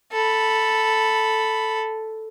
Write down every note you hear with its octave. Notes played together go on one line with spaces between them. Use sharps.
A4 B5